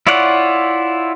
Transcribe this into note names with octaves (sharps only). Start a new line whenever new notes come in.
E4 F4 C#5 D5 F#5